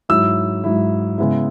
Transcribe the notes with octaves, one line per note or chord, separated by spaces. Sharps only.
G#2 F#3 E4 E6
G#2 F#3 E4
C#3 G#3 B3 E4